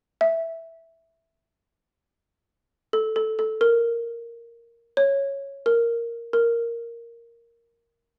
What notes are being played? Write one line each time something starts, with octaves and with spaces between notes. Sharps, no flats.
E5
A4
A4
A4
A#4
C#5
A#4
A#4